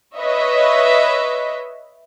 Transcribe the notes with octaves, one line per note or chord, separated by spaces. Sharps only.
B4 C#5 D#5 E5